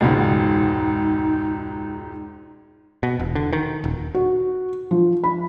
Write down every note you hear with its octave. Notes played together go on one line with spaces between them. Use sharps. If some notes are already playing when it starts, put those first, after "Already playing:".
E1 C#2 G#2 D#4
B2
E1
D3
D#3
D#1
F#4
F3
B5